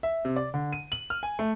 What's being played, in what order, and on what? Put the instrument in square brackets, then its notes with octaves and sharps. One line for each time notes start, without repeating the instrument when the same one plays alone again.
[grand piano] E5
C3
D5
D3
D#7
F#7
F6
G#5
A3